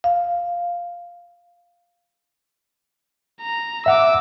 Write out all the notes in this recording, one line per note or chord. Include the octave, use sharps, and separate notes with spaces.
F5
A#5
E5 F#5 D6 E6